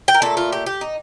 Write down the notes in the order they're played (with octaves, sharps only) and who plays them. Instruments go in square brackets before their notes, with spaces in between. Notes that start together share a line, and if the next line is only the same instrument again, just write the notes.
[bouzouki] G5
A#4
A#2 A3 A4
F4
G4
G4
D#4